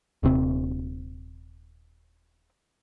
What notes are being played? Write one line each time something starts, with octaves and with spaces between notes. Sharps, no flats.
D#1 C3 C4